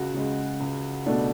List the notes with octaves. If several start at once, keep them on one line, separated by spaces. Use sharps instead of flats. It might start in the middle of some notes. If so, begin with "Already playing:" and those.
Already playing: C#2 F#4
C#3 G#3
C#2
B2 A3 D4